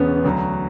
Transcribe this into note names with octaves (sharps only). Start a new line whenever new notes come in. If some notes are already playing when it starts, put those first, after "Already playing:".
Already playing: E1 E2 C#3 B3 C#4
D2 D3 F#3